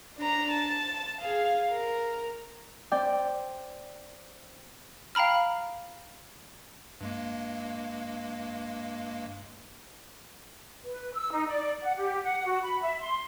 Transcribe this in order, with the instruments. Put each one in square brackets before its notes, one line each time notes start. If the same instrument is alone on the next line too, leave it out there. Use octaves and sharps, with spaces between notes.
[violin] D4 A#5
A5
G#4 F5
A#4
[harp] C4 D5 G5
[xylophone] F5 G5 A#5 B5 F6
[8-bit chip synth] G2 G#3 A#3
[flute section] B4
E6
D#4
D5
F#5
G4
F#5
F#4
B5
E5
C6